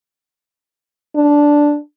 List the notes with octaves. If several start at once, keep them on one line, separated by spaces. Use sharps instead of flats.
D4